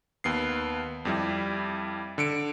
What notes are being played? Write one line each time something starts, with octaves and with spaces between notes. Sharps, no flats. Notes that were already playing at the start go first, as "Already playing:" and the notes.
D#2 B3 C7
F2 G3 E4
D3 C#7 D7